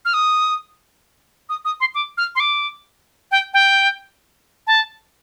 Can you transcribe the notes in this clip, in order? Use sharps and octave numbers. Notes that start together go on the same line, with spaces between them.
F6
D#6
D#6
D#6
C6
D6
F6
C6
D6
G5
G5
A5